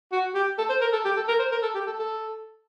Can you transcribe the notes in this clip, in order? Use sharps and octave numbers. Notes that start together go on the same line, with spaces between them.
F#4
G4
A4
C5
A#4
A4
G4
A4
A#4
C5
A#4
A4
G4
A4
A4